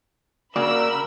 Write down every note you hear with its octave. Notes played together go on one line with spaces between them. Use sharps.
C#3 A#3 F#4 A#4 D5 B5 E6